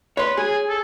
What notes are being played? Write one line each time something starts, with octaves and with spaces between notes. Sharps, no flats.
B4 C#5 C6
G#4 G#5
A4